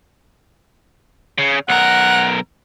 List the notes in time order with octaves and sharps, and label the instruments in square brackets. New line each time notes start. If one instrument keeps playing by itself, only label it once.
[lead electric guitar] C#3
[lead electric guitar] B1 A#4 [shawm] F#5